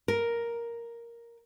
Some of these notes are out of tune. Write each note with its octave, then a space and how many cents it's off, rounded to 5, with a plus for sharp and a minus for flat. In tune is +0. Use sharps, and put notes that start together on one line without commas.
A#4 +5